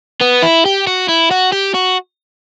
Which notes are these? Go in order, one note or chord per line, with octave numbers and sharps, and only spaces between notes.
B3
E4
G4
F#4
E4
F#4
G4
F#4